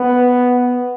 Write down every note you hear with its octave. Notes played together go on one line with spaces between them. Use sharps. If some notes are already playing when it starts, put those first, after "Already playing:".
Already playing: B3